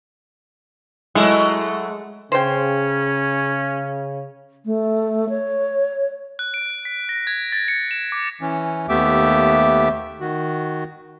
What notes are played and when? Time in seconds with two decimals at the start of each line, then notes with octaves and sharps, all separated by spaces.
1.15 F#3 G#3 A3 E4
2.32 C#3 C#4 C5 G5
4.66 A3
5.29 C#5
6.39 F#6
6.54 D7
6.85 B6
7.09 A#6
7.27 G#6
7.52 A6
7.68 C#7
7.91 E7
8.12 D6
8.41 E3 C#4
8.89 D#2 A3 B3 G4 E5 D6
10.21 D#3 F#4